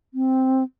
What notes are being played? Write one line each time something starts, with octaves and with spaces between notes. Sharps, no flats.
C4